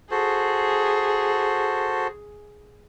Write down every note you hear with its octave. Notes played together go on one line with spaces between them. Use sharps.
F#4 G#4 A4 C5